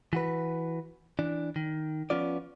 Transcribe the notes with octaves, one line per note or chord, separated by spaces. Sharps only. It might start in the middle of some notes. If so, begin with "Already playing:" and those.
E3 F#4 B4
E3 D4
D#3
F3 B3 C#4 F4 D5